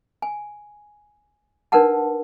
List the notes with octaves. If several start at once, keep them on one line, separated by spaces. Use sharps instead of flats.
G#5
D4 D#4 A#4 B4 F#5 A5